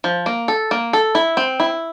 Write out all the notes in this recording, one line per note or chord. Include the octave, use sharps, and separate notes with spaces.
F3
A#3
A4
A#3
A4
E4
C4
E4